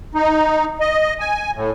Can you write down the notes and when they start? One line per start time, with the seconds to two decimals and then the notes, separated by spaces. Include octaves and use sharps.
0.15 D#4
0.80 D#5
1.20 G#5
1.55 A2